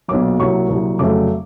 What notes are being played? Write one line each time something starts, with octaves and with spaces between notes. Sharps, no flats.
B1 A#2 F#3 D6
C2 A#2 F#3 C#6
C2 A#2 F#3
F1 F2 C#3 F#3 A3 D6